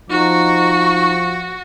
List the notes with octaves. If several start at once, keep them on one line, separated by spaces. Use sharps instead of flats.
F3 D#4 F#4 C#6